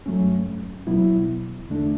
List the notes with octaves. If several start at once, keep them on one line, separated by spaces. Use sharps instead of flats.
G2 F#3 A3 C#4
B2 F#3 B3 E4
E2 D3 A3 D4